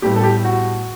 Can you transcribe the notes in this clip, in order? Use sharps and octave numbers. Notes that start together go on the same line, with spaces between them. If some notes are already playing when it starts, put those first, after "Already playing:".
A2 G3 B3 G4
A4
G4
F#4